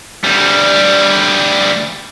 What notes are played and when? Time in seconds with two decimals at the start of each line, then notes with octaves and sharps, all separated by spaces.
0.24 D2 G3